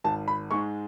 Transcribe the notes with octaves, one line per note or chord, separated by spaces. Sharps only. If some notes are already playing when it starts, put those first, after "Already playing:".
G#1 A5
B5
G#2 G#3 C#6